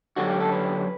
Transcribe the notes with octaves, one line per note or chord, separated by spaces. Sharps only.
F#2 D3 G3 C#4 F#4
G4
A4
B4